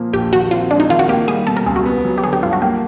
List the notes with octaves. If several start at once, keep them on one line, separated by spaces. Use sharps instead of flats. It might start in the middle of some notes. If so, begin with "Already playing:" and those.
Already playing: A#2 F3 A#3
A#1 G4
D#3 F#4
C4 F4
G#3 D4
D#4
D#3 F4
F#4
A#3 G4
G3 G#4
B2 A4
A#4
C#2 G#4
F#4
B3
F#3
G4
D3 G#4
G4
G2 F4
F#4
A#3 G4